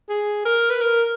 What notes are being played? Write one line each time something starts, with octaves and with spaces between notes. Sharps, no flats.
G#4
A#4
B4
A#4